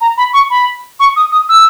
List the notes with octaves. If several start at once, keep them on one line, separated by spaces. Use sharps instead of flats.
A#5
B5
C#6
B5
C#6
D#6
D#6
E6